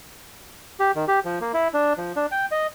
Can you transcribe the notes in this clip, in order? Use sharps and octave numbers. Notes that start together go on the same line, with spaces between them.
G4
D#3
G4
F3
A#3
E4
D4
F3
D4
G5
D#5